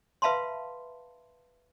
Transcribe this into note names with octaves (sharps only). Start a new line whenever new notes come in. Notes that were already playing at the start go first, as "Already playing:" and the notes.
B4 E5 F5 A5 B5 C6